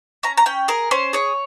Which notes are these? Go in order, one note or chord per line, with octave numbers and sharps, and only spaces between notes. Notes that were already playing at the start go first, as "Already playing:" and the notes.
C#4 A#5
A#5
C#4 G5
G#4 A#4
C#4 C5
G#4 C#5